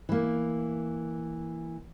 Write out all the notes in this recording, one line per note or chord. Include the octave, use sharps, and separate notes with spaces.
E3 A#3